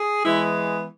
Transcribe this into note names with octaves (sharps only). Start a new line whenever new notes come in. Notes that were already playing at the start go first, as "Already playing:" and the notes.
Already playing: G#4
E3 G#3 B3 E4